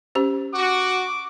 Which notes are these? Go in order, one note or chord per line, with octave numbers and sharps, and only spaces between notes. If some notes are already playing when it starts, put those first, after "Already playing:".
C#4 G4 C5
F#4 D6